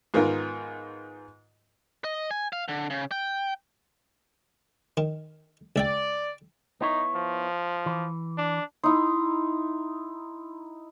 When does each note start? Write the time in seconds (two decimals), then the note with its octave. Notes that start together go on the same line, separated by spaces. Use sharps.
0.14 G#2 D#3 B3 F4 A#4
2.04 D#5
2.31 G#5
2.53 F5
2.68 D3
2.90 C#3
3.11 G5
4.97 D#3
5.76 C#2 D5 E5 G5
6.81 B3 D#4 E4 C#5
7.15 F3
7.86 E3
8.38 D4
8.84 D#4 E4 C6